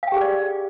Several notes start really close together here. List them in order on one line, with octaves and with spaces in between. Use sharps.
F5 G5 G4 G#4 D5